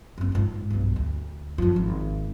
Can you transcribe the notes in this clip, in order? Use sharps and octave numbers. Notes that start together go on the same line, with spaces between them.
F#1 C4
G#2 F4
B1 G2
D2
F#2 F3
G#1